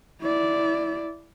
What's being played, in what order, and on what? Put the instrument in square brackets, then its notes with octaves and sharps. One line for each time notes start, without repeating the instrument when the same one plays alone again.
[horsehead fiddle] E4 D5